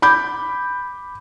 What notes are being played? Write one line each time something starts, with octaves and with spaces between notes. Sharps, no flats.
B5 D6 G6